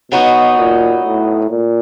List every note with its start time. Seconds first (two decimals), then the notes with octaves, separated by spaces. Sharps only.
0.12 B2 F#3 B3 D#4 F#4
0.58 A#2
1.05 A2
1.50 A#2